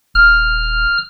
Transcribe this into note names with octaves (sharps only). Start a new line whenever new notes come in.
D#1 F6